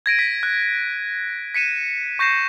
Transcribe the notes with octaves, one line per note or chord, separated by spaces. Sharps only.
G#6 A#6 D7 D#7
B6
F#6
B6 C#7 D#7 E7
C#6 G6 A#6 C7 E7